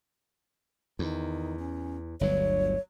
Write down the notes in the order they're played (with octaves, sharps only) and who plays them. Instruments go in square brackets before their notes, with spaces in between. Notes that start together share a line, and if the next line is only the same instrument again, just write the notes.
[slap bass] E2 [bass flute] D#3
[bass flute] C#4
[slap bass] G1 D2 F#3 [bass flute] C#5